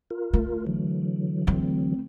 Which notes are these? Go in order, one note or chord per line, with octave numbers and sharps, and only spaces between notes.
F4 A#4
A3
D3 E3 F#3
A3 C4